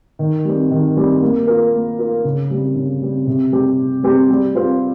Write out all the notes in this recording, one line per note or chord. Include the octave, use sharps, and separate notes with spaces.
D#3
G3 C4
D#3
G3 C4
A#3
F4 A#4
A#3
F4 A#4
C#3
G3 C4
C#3
G3 C4
C3
G3 C4 G4
C3
G3 C4 G4
G3
C4 F4 C5